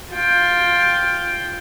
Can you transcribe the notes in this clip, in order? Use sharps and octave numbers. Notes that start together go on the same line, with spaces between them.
F4 G5